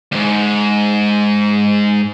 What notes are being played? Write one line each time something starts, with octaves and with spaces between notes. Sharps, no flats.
D2 G#2